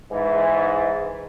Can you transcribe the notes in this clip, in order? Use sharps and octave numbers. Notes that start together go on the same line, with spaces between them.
G#2 E3